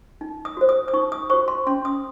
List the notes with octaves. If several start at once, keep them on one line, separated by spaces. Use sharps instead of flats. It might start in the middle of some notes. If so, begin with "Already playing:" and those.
D#4
D#6
F#4 C5
D#6
D#6
D#4 C#6
D#6
F#4 C5 C#6
C6
C#4 C6
D#6